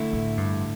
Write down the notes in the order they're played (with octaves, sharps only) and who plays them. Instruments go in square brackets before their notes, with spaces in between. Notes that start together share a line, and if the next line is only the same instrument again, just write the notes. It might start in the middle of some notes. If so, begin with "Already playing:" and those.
Already playing: [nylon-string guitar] D3 A3 E4
[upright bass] A2
G2